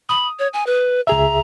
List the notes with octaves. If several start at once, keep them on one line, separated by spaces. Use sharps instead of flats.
B5 D#6
C#5
G#5
B4
C#2 G#4 E5 A#5